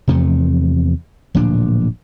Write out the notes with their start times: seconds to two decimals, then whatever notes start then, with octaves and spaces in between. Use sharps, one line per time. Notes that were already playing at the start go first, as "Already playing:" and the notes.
0.08 E2 C3 F3 A3
1.35 D1 A#2 F3 D4